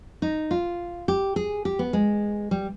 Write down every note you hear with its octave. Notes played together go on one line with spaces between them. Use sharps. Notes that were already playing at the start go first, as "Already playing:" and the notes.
D#4
F4
G4
G#4
G4
B3
G#3
G3